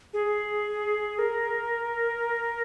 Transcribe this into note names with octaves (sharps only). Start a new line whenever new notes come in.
G#4
A#4